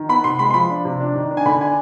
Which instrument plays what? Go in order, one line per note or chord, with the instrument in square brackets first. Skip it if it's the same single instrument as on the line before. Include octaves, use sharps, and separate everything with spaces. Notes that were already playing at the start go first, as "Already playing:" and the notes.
Already playing: [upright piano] D#3
B3 B5
C3 C6
G#3 B5
C6
F3 B5
D4
C3
D4
D#3
D4
G#5
D3 B5
D4 G#5